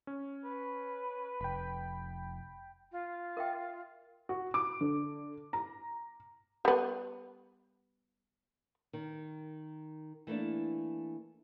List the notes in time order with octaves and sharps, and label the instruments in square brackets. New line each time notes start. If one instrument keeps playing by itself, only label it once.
[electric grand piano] C#4
[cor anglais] B4
[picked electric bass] F1 [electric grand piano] G5 B5
[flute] F4
[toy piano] A#4 E5 G5
[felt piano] F#4
D6
D3
A#5
[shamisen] G3 B3
[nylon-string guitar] D#3
E3 A3 A#3 D4